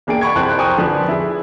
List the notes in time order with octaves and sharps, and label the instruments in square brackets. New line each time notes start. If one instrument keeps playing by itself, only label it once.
[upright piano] E1 A#3 D4 G#4 G5 D7
F#5 B5 C#6 G#6
C2 F2 C5 A5 F#6 D7
A#4 C5 G5 G#5 C#6 D#6
D3 F3 D4 B4
E4 G#4